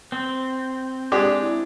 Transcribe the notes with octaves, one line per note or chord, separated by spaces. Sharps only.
C4
G#3 D4 G4
E4